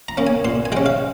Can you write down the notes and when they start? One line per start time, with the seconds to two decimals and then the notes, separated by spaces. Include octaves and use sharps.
0.08 A#5
0.17 A#3 C#4
0.27 G#5
0.45 A#2 C6
0.65 G#5
0.72 G#3 G5
0.77 C#4
0.86 F5